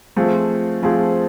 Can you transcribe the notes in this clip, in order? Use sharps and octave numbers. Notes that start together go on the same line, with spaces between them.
F3 A3 C4 F4 G#4
F3 A3 C4 F4 G#4